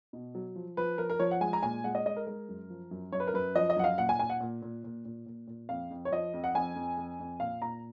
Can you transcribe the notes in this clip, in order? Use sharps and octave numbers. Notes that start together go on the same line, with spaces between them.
B2
F#3
F3
F3 B4
F3 A#4
A#4
F3 C#5
F#5
G#3 G#5
A#5
A#2 G#5
G#3 F#5
D#5
G#3 D#5
A#4
G#3 A#4
F#2
F3
F#2
F#2 C#5
B4
A#4
F#2 B4
F3 D#5
D#5
F#2 F#5
F5
A#2 F#5
G#5
A#2 G#5
F#5
A#2
A#2
A#2
A#2
A#2
A#2
F2 F5
F2
C#5
F3 D#5
F2
F#5
F2 G#5
F2
F2
F2
A#2 F5
A#2 A#5